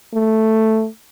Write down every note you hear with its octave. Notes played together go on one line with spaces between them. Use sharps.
A3